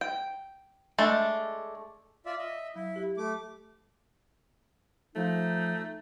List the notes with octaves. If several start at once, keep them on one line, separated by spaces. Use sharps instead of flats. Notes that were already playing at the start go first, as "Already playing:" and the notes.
G5
G#3 A3 D4
F4 D5 E5
D#5 E5
F#3 E4
G4 E5
A3 D6
F3 A3 D#4